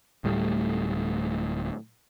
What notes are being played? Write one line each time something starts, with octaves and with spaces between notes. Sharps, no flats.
D1 A2 G3 A3